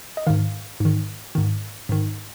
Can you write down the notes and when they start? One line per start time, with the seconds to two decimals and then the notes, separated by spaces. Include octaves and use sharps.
0.17 D#5
0.27 G#2 D#3 F5
0.80 G#2 D#3
1.35 G#2 D#3
1.89 G#2 D#3